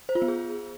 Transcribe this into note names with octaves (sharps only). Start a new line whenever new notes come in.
C5
F4
B3
G#4